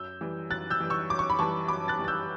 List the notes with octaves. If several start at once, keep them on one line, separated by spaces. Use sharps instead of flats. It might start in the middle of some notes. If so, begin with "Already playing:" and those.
Already playing: F#2 E6 G6
E3 G3
F#2 F#6 A6
E6 G6
E3 G3
C#6 E6
F#2 D6
C#6
B5
E3 G3 A5 C#6
F#2 B5 D6
F#6 A6
E3 G3
A6
E6 G6